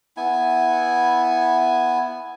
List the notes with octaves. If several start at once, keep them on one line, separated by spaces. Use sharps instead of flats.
B3 E4 G#5